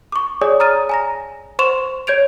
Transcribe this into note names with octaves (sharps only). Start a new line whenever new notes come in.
C#6 D6
G#4 C#5 D5 G#5 D#6
A#5 D#6 F6 A6 D#7
G#5 A#5 A#6
C5 C6 C#6 E7 F7
C#5 G6 G#6 D7 F7